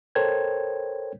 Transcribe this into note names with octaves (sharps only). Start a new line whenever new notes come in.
A4 A#4 C5 C#5 G5 G#6